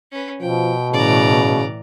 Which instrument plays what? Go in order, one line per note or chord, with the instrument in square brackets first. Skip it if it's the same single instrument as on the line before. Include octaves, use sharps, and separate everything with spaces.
[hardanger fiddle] C#4 B4
[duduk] B2 [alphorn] F3 [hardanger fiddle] G5
[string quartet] A2 E3 [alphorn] C#3 [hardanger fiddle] D5 A#5